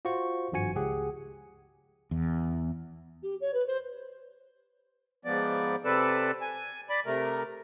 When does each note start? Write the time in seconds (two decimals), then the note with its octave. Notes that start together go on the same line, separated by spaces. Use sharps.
0.05 F4 F#4 C5 C#6
0.52 G#1 G2 F3 F#4 G#5 C#7
0.75 C#2 G4 G#4 F#5
2.11 E2
3.22 G4
3.40 C#5
3.53 B4
3.66 C5
5.25 G#2 F3 B3 D5
5.85 C3 C4 A4 B4 D5 E6
6.41 G#5
6.90 D5 B5
7.06 C3 A3 A#4